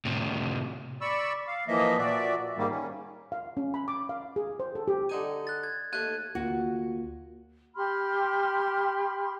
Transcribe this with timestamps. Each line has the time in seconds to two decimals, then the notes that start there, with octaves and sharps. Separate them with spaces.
0.05 A2 C3
1.01 D5 B5 C#6 E6
1.47 F5
1.68 E3 F3 A#3 D#5 E5
1.98 A#2 F#4 D5 E5
2.57 G#2 D#3 G3 A#3
2.70 C#4
3.32 F5
3.57 C#4
3.74 B5
3.88 D6
4.09 F5
4.36 G#4
4.60 C5
4.75 A4
4.88 G4
5.09 D3 D#4 G#5
5.47 F#6 A6
5.63 G#6
5.93 D#2 A3 F#6 G#6 D#7
6.35 D2 A#3 F4 F#4
7.75 G4 B5 C6 F6